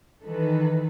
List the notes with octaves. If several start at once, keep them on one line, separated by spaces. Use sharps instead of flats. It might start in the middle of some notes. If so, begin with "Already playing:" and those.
D#3 E3 A4 B4